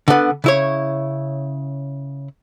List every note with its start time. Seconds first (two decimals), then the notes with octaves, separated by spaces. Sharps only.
0.08 D3 B3
0.44 C#3 E4 C#5